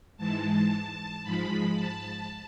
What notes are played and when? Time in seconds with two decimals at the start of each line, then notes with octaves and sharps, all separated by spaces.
0.17 G#2 E3 G#3 A5
1.23 G#2 F3 G#3 B5
1.77 A5